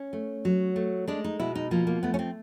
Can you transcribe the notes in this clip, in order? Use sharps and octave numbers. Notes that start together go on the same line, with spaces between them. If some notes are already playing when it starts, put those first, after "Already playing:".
Already playing: C#4
A3
F#3
A3
G#3 D4
D#4
B2 E4
D#4
F3 A#3
A#3
A3 B3
C#4
C4